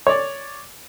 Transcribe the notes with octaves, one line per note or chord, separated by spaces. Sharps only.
C#5 D5